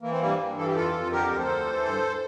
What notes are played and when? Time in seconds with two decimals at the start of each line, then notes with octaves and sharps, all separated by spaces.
0.02 E3 A#3
0.11 C4
0.20 G2 G3 A#3
0.39 G2
0.56 E3 A4
0.66 G4
0.75 F2 F4 A4
0.93 F2
1.12 D3 G4 A#4
1.30 D2
1.39 A4 C5
1.48 D2
1.66 E3
1.85 G2